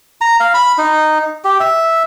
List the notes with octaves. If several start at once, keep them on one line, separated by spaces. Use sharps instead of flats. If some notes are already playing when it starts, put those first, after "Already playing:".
A#5
F5
B5
D#4
G4
E5